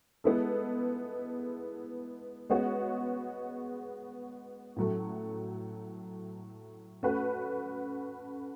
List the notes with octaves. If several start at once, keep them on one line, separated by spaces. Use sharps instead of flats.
G#3 B3 E4 A4
G#3 B3 F#4 C#5
A2 F#3 A3
A3 C#4 F#4 B4